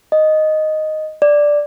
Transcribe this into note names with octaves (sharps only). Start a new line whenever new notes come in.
D#5
D5